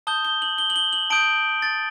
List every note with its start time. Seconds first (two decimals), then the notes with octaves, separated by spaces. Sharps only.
0.07 A5 D#6 G6 G7
0.25 G7
0.42 F#7
0.58 G7
0.70 F#7
0.76 G7
0.93 F#7
1.10 A5 D#6 G6 D7
1.62 A6